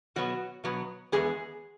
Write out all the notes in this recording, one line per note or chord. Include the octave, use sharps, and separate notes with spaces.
B2 F#3 B3 F#4
B2 F#3 B3
E2 B2 G#3 B3 G#4